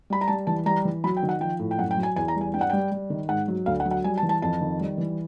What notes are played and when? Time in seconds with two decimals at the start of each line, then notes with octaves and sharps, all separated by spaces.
0.10 G3 B5
0.21 A#5
0.28 G3 A5
0.47 E3 A5
0.66 G3 A#5
0.85 E3
1.04 F#3 B5
1.17 G5
1.23 D#3
1.29 F#5
1.41 F3 G5
1.59 A2
1.71 G5
1.79 F#2 F#5
1.91 G5
1.97 F#3
2.03 G#5
2.16 E2 G#5
2.28 A#5
2.36 G3
2.41 G#5
2.54 G2 G5
2.61 F#5
2.70 G3 G5
2.92 G3
3.10 D#3
3.29 G#2 F#5
3.48 F#3
3.66 D2 F5
3.80 F#5
3.85 F#3
3.91 F#5
4.04 G3 G#5
4.18 A5
4.23 E3
4.29 A5
4.42 F2 A5
4.61 D#3
4.80 G3
4.98 E3